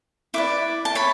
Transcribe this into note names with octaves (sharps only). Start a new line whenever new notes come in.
E4 B4 D5 D6
A5
C#5 B5